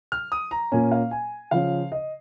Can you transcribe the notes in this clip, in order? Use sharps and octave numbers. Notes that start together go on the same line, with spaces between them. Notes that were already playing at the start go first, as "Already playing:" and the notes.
F6
D#6
A#5
A#2 A#3 C#4 G#5
F5
G#5
C#3 F3 C#4 F5
D#5